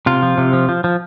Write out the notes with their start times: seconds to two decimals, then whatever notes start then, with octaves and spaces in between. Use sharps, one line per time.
0.06 C3 F4
0.22 F3
0.38 C3
0.53 F3
0.69 F3
0.84 F3